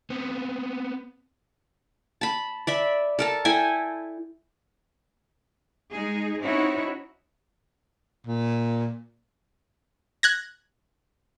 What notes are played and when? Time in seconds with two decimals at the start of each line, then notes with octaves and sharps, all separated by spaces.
0.10 B3 C4
2.21 A5 B5
2.67 D5 E5 B5
3.19 A4 A#4 A5
3.45 E4 A4 G5 G#5
5.90 G#3 D#4 G#4
6.40 C4 C#4 D#4 E4 F#4 C#5
8.27 A#2
10.23 F#6 G#6 A#6